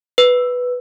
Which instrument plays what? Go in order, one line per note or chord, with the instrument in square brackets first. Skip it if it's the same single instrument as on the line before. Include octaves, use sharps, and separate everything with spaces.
[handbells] B4